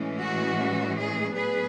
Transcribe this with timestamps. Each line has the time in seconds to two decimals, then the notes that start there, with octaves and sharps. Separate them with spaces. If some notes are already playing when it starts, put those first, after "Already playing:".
Already playing: A2 E3 G#3 C#4
0.21 F#4
0.96 G#4
1.33 A2 F#3 B3 D4 G#4 B4